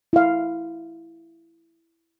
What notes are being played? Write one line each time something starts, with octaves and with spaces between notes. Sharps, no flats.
E4 F5